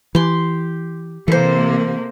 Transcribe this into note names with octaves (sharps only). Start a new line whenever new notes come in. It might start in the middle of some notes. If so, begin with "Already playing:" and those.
E3 G4 C6
C3 E3 A#3 A4 C5